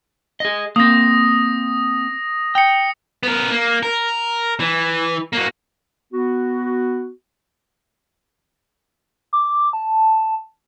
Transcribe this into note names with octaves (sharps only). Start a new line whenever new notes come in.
G#4 D#5
A#3 C4 D#6 A#6
G5 D#6 C#7
B3 A#4
A#3
A#4
E3
A#3 F#4
B3 F#4
D6
A5